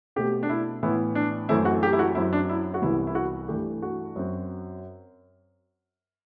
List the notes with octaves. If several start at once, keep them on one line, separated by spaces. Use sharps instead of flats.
B2 A3 C4 G4
D4
E4
A2 E3 B3 E4
D4
F#2 E3 A3 C4 E4
F#4
G4
E4
F#4
F#2 F#3 C4 E4
D4
E4
F#4
C2 C3 E3 G3 B3 E4
E4
F#4
G2 E3 A3 G4
F#4
F#2 F#3 C4